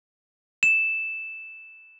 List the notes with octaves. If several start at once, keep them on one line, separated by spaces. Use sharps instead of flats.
E7